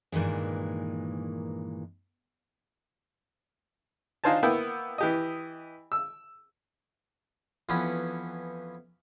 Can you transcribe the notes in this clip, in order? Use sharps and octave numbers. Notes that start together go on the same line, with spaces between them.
G2 A#2 D#3 E3 G#3
D4 D#4 F4 C5 G#5 A5
A#3 B3 E4 G5
E3 G4 D#5
E6
F2 E3 B3 C#4 B5